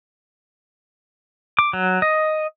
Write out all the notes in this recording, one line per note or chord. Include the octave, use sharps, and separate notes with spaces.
D6
F#3
D#5